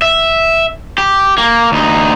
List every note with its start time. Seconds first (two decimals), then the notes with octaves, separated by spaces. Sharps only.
0.02 E5
0.98 G4
1.38 A#3
1.72 D2 D#4